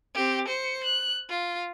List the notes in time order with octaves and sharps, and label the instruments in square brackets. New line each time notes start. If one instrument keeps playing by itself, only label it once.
[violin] C4 G4
C5 C#7
F#6
F4